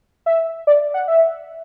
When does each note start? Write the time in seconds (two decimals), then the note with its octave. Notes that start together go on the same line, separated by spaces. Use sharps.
0.26 E5
0.67 D5
0.94 F#5
1.08 E5